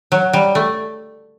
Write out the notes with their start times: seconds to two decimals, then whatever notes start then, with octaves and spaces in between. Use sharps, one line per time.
0.12 F#3
0.33 G3
0.55 A3